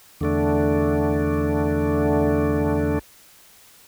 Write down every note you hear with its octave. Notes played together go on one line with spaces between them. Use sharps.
E2 D3 A3 D4